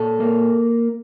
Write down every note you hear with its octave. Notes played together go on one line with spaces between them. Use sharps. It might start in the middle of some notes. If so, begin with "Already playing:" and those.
Already playing: A#2 A4
A#3